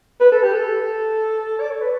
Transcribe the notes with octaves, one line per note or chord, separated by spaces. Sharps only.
B4
A4
G4
A4
D5
C#5
B4